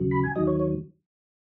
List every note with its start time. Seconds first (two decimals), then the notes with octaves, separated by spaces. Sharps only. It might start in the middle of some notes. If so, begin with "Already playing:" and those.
Already playing: D#2 C#3 F#3
0.11 B5
0.23 G#5
0.36 D#2 D#3 F#3 D#5
0.47 C#5
0.59 C#5